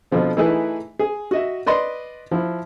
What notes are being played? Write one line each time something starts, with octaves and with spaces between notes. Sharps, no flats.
B2 D3 F3 C4
E3 A3 D#4 E4 G#4 B4
G#4
F#4 D#5 E5
B4 D5 D#5 C6
F3 E4